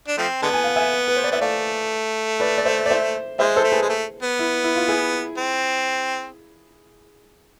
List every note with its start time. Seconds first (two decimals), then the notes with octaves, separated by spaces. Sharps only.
0.08 D4
0.18 F3 A3 C4
0.42 D3 G#3 B3 A5
0.53 G#5
0.64 F5
0.76 E5 G#5
1.07 B4
1.17 C5
1.24 D5
1.31 B3 E5
1.41 A3 D5 F5
2.40 B4 D5
2.58 D5
2.66 C5 E5
2.86 D5
2.91 C5 E5
3.39 G#3 C5 E5
3.56 A4 C5
3.64 A3
3.72 G#4 B4
3.82 G#3
3.89 A3
4.23 B3
4.39 E4
4.64 E4
4.76 F4
4.88 E4 G#4
5.38 C4